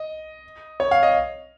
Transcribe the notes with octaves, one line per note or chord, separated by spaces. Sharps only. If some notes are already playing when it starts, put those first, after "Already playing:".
Already playing: D#5
C#5
F5
D#5